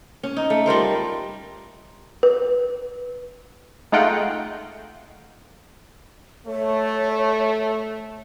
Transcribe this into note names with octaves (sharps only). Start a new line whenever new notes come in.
C#4
D#4
A3
G3 F4 A#4 C5
B4
G#3 A3 D#4 F4 F#5 G5
A3 C#5